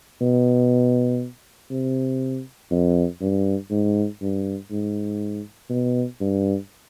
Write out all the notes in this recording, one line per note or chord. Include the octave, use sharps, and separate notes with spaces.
B2
C3
F2
G2
G#2
G2
G#2
B2
G2